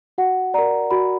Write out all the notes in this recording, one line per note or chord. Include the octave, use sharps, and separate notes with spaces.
F#4 F#5
A#4 D5 A#5
F#4 B5